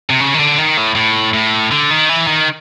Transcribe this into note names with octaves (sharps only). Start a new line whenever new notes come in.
C3
C#3
D#3
D3
D#3
A2
A2
A2
D3
D#3
E3
D#3